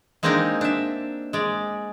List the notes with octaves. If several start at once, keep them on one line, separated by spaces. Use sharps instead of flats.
G#3 A#3 C4 D4 D#4 A#4
D4 E5
G#3 D5